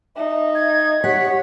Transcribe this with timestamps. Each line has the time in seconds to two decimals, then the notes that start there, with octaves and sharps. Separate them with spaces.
0.16 D#4 E5
0.55 G#6
1.04 G4 C#5 F#5 B6